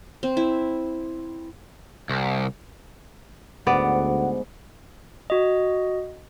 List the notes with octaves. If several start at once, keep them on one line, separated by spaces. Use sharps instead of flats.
C4
E4
C2
D2 G#2 B3 D5 F#5
F#4 D#5